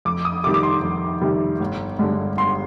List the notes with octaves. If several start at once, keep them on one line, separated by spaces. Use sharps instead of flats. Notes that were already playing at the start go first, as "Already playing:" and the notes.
F2 D6
D#6
C3 D#3 G3 D6
D6
C6
F2
C3 D#3 G3
G1
G2 D3 G#3
G1 C6